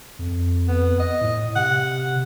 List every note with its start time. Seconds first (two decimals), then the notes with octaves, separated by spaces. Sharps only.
0.19 F2
0.68 B3
1.00 D#5
1.21 A2
1.56 C3 F#5